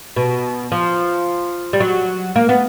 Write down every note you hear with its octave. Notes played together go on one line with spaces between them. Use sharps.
B2
F3
G3
F#3
A#3
B3